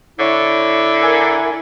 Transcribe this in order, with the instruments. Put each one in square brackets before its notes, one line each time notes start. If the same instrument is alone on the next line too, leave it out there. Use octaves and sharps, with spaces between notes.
[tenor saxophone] D3 [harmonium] E4 [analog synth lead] C#5
[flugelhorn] A#4 [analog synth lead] G#5